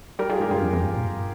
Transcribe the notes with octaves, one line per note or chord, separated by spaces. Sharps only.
G3 G4 A#4
G3 F4 G#4
G#2 G4 A#4
G2 F4 G#4
F2
F2
G2
A#2
G2